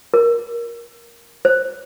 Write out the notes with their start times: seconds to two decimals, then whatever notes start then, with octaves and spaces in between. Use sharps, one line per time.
0.14 A#4
1.45 C5